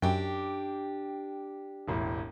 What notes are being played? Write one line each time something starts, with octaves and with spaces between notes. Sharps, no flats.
F#2 D4 G4 G5
E1 A1 E4